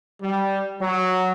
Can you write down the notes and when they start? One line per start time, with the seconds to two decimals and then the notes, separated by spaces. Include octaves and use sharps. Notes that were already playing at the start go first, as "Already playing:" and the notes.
0.22 G3
0.80 F#3